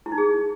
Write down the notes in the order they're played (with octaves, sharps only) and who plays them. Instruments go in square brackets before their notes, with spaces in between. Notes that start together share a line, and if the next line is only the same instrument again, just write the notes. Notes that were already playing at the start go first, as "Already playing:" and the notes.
[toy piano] E4
D#4
G#4